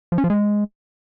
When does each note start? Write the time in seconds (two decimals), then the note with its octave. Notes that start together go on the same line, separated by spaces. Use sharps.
0.12 F3
0.18 C#4
0.24 F3
0.30 G#3